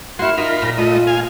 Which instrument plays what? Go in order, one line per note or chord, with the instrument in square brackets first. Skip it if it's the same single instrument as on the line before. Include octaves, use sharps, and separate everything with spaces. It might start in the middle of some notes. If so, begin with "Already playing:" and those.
[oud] A#3 E4 [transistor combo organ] F#4 C6 [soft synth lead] F6
[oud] D#4 [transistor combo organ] F4 A#4 B5
[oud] A#2 [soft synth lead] A#6
[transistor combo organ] A3 D#5 [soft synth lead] F4
[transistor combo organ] F5 G#5